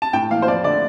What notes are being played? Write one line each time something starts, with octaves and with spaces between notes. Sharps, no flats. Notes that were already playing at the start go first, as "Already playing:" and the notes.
A5
A2 G5
E3 A#3 F5
C5
F2 D5
D3 A3 D5